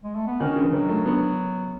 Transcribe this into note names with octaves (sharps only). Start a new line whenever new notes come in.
G#3
A3
B3
D#3 C#4
C#3
E3
D#3 F#3
A3
B3